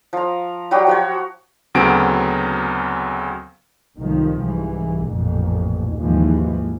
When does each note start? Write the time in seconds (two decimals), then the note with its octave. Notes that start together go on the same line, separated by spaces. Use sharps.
0.13 F3 A#5
0.71 F#3 G3 F#4 G4
0.87 F3 F#4 C#5
1.75 D2 C#3 F#3 B3 C4 D7
3.98 C2 A2 D#3 F3
4.39 C2 G#2 E3
5.08 A1 F2 A#2
5.97 D#2 G#2 E3 F3